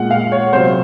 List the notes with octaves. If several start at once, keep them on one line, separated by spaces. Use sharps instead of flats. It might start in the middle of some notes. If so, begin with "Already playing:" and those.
Already playing: A#2 G#3 F#5
F5
C#5
C3 F#3 C5